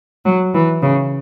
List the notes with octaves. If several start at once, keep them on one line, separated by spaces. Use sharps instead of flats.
F#3
E3
C#3